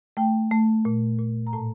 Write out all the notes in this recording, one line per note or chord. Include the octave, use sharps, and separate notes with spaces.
A3 G5
A3
A#2
A#2
A#5
A2 A5